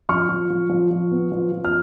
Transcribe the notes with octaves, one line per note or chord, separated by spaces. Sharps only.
F3 C#6 F6
F3
F3
F3
F3
B3
F3
F3
F6